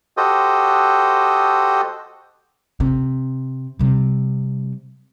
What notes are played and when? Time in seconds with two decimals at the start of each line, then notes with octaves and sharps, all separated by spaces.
0.17 F#4 G4 A4 C5 D#5 D#6
2.80 C3
3.79 C3 G3